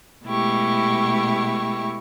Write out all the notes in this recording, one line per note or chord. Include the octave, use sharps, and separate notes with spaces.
B2 G#3 A3 E4 G4 C#6